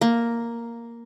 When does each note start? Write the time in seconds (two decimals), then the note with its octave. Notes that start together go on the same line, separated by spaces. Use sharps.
0.01 A#3